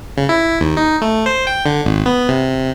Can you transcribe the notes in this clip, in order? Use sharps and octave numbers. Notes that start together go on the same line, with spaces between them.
C#3
E4
D#2
D#4
A3
C5
G5
D3
G#1
B3
C3